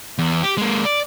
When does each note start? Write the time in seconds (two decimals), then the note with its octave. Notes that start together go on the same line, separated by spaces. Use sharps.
0.18 E2
0.43 G4
0.57 G#3 A#3
0.85 D5